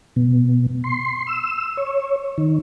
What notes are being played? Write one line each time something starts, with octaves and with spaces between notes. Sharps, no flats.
B2
C6
E6
C#5
D#3